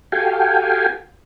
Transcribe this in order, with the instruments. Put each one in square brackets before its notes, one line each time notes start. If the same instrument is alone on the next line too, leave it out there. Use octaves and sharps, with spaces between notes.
[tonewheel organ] F#4 G4 A4 F5 G5 G#5